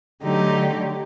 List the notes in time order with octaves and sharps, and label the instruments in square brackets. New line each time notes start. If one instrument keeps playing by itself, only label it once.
[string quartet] D3 F#3 A3 D#4 G4